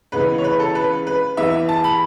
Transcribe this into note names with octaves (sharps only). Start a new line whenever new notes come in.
C#2 C#3 E3 B3 B4
C#5
B4
A4
B4
B4
E2 E3 B3 E5
A5
B5